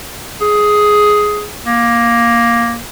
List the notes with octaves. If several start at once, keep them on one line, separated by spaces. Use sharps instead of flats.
G#4
A#3